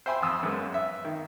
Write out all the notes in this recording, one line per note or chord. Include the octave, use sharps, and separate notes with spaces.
C5 E5 G5 G#5 B5 C6
F2 D#6 E6
F#2 G#3 B3
E5
D#3